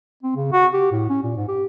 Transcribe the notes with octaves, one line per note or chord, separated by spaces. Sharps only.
C4
C#3
F#4
G4
A2
C#4
A#2
G#2
G4